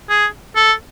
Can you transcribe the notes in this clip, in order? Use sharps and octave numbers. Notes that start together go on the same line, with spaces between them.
G#4
A4